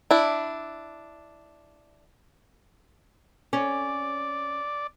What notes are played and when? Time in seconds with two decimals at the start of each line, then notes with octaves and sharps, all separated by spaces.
0.11 D4 E4
3.53 C#4 D5